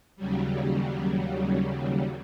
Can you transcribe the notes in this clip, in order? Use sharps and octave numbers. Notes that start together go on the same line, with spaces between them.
D#2 C#3 F#3 G3